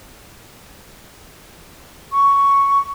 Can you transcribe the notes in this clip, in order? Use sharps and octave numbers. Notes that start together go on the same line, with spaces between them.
C#6